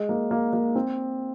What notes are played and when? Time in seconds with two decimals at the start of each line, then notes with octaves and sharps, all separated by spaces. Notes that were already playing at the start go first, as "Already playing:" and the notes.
Already playing: G#3
0.09 A#3
0.31 A#3
0.53 A#3
0.75 C4